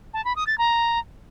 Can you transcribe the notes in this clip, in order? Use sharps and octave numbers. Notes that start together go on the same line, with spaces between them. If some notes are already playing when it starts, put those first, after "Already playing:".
A5
B5
D#6
A6
A#5